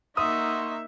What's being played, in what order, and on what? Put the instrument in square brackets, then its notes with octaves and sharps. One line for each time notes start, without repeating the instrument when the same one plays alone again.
[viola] A#3 D#4 [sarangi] E5 [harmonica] F#5 C6 C#6 [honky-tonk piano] D#6